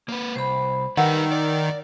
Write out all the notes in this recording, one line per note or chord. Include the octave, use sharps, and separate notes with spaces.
A#3 B4
C2 C5 B5
D#3 G3 B4 F#5 E6
D5